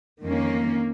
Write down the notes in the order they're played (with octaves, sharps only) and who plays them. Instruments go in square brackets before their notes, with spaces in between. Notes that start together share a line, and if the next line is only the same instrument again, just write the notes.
[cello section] F2 D#3 A#3 C#4